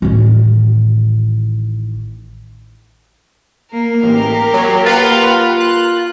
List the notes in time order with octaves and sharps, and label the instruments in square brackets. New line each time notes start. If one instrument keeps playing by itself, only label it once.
[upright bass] A1 D#3
[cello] A#3 [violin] A#4
[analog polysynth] A1 [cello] A#3 G4
[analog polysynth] F#3
[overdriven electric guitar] F4 [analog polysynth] B4 F5 F#5
[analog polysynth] F#6